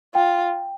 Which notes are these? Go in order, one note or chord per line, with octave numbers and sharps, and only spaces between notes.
F4 G5